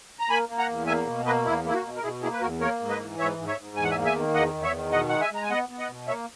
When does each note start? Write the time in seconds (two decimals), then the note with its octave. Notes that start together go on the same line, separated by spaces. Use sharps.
0.20 A#5
0.29 A#3 G#5 B5
0.49 A#3
0.58 F#5 A#5
0.68 E2
0.87 A#3 E5 G#5
1.06 B2
1.25 A#3 B4 D#5
1.45 E2 E4
1.64 A#3 E4
1.74 F#4
1.83 B2
1.95 A#4
2.03 B2 E4 G#4
2.22 A#3 E4 G#4
2.32 B4
2.41 E2 F#4 A#4
2.61 A#3 A#4 C#5
2.80 G#2
2.89 B4 D#5
2.99 E3
3.19 G#2 C#5 E5
3.38 G#2
3.48 C#5 E5
3.57 G#2
3.76 E2 G#5
3.84 F#5
3.91 E5 G#5
3.96 A#3
4.05 E5 G#5
4.16 D#3
4.34 E2 D#5 F#5
4.54 E2
4.63 C#5 E5
4.73 D#3
4.92 B2 D#5 F#5
5.09 G#3 F#5
5.21 E5 G#5
5.31 G#3 A#5
5.42 G#5
5.50 B3 D#5 F#5
5.69 B3
5.79 D#5 F#5
5.89 B2
6.08 A#3 C#5 E5